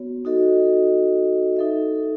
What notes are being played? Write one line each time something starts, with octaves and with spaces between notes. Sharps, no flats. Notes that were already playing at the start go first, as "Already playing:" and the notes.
Already playing: B3 F#4 C#5
D#4 F#4 A4 D#5
D#4 A4 E5